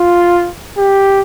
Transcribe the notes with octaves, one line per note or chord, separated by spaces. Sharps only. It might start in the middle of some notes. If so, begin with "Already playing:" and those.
Already playing: F4
G4